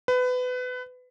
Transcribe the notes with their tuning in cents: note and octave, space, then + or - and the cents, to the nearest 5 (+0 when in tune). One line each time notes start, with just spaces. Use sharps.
B4 +25